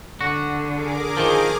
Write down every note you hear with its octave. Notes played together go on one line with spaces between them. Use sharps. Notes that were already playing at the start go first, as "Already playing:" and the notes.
D3 F#4
G#4 A#4 D6
D#3 F3